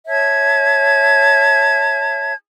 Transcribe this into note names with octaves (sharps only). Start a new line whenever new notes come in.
C#5 E5 A5 G#6